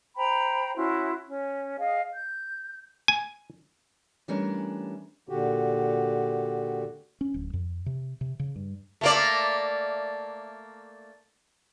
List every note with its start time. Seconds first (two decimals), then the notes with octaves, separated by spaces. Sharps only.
0.16 C5 G5 A#5 B5
0.77 C#4 E4 F#4 C6
1.27 C#4
1.78 G#4 D#5 F5
2.13 G6
3.08 G#5
4.28 E3 G3 A3 C#4 D4 A#4
5.29 A#2 D3 F#4 G4
7.21 C#4
7.34 D1
7.53 F2
7.86 C3
8.21 C3
8.39 C#3
8.56 G2
9.01 A3 A#3 D5